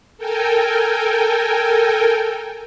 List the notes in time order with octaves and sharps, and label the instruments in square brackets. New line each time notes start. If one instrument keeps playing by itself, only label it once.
[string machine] A4 A#4 G5 G#5